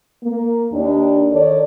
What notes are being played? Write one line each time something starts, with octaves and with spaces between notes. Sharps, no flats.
A#3
D#2 D4
D#3 A4 C#5 D5